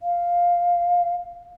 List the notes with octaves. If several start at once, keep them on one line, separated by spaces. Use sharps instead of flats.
F5